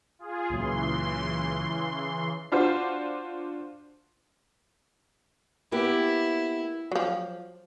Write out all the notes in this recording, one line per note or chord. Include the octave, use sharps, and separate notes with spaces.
F4 G#4
C#2 A#2 C#3 E3 F#3 C6
D4 F4 F#4 C5
A#3 B3 E4 G4
F3 F#3